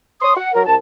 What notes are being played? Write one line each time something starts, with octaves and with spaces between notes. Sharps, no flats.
C#5 C6 D#6
F#5
F#3 A#4
C2 A5